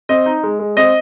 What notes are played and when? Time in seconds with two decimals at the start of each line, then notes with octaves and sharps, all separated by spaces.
0.09 C4 D#5
0.26 D#4
0.43 G#3
0.59 G#3
0.77 C4 D#5